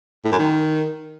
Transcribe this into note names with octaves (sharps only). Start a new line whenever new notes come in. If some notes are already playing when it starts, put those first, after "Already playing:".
A2
F#2
D#3